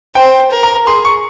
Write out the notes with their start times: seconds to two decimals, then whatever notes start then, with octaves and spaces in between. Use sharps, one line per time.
0.15 C5 G5
0.51 A#4
0.63 A#5
0.87 G#4 C6
1.05 C#6